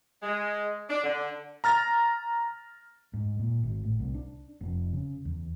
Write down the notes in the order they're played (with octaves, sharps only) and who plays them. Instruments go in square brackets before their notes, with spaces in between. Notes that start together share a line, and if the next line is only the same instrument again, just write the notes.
[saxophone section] G#3
D4
D3
[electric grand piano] A#5 F6 A6 A#6
[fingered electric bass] G#2
A#2
G#1
A2
C2
D4
F1
C#3
E2